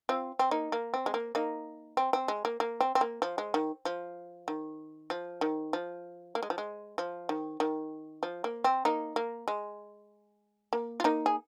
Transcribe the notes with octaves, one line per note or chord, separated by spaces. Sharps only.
C4 F4
C4
A#3 D#4
A#3
C4
G#3
A#3
A#3 D#4
C4
C4
G#3
A#3
A#3
C4
C4
A#3
F3
G#3
D#3
F3
D#3
F3
D#3
F3
A#3
G#3
F3
G#3
F3
D#3
D#3
F3
A#3
C4
A#3 D#4
A#3
G#3
A#3
F4
A#3 D#4
G#4